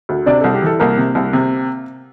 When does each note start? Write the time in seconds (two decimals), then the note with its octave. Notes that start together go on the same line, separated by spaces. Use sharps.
0.09 D2
0.26 C3 D4 D5
0.41 C2 A4
0.54 G4
0.62 E3 A4
0.79 C2 A#3 A#4
0.97 C3
1.15 C2
1.33 C3